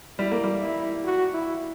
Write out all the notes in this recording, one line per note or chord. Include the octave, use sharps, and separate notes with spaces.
G3 E4
A#3
G3
E4
F#4
E4